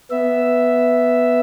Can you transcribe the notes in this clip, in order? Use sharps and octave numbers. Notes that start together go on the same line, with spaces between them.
B3 E5